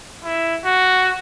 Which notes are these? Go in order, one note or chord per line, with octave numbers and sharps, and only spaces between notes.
E4
F#4